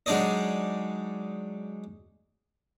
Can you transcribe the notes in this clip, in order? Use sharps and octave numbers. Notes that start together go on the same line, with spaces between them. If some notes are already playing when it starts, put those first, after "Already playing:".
F#3 G#3 D4 D#4 D5 D#5